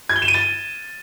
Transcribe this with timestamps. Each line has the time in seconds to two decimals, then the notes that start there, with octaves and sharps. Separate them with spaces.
0.09 G#6
0.16 G7
0.22 E7
0.28 D#7
0.34 A6